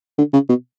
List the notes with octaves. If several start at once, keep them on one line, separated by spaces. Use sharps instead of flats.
D3
C#3
B2